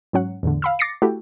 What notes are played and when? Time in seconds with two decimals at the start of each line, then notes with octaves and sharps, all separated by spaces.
0.13 G#2 F#3 C#4 F#5
0.43 E2 A2 D3
0.62 F5 B5 E6
0.79 D6 A6 A#6 C7 C#7
1.02 A3 E4 F#4 G4 A4